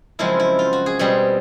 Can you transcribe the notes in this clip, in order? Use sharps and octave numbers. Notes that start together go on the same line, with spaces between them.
F#2 C#3 F3 G#3 C4 E4
E4
F4
F#4
G#4
B2 G3 C4 G#4